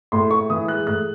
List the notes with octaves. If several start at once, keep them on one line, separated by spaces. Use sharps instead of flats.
A2 C6
A2 C#6
E3 D#6
G#3 F#6
A2 F#6